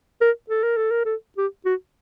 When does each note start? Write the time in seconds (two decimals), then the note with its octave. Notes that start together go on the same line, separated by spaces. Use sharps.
0.21 A#4
0.49 A4
0.63 A#4
0.77 A4
0.91 A#4
1.05 A4
1.38 G4
1.65 F#4